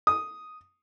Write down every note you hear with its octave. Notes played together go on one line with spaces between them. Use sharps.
D#6